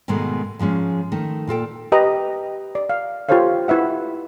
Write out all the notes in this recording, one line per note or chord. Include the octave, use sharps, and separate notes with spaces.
G#2 B2 D#3 G#3 A3
G#2 F3 G#3 C#4
D#3 A3
A#2 F4 A4 G5
G4 B4 D#5 A#5
D5
F5
F4 G4 A4 C5 C#5 F5
E4 B4 E5 F#5